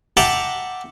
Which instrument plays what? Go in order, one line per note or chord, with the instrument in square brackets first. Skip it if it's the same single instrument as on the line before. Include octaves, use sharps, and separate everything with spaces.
[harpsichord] E5 F#5 G5 A5 A#5 D6